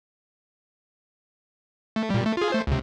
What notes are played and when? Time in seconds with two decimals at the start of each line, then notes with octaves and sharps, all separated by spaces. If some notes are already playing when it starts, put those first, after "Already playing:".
1.96 A3
2.10 A#2 G3
2.26 A3
2.37 F4 G#4
2.52 A3 C5
2.67 C#2 C3